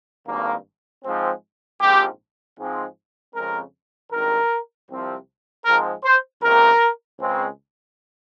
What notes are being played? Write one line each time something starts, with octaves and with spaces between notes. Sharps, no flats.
G#1 G2 D#3 A#3
G#2 F3 G#3 C4
A#1 G#2 F3 G#3 C4 G4
G#2 F3 G#3 C4
F2 C#3 G#3 C4 A#4
G#1 G2 D#3 A#4
C2 C3 F3 C4
G#2 F3 G#3 C4 A#4
C5
C#2 C3 D#3 A#3 A#4
C#2 C#3 G#3 C4